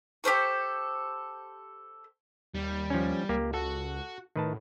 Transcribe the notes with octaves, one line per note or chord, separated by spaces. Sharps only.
G4 A4 C5 C#6
D#2 G3
F3 C#4
C#2 A#3 G4
F#4 A4
A2 D#3 B4 A5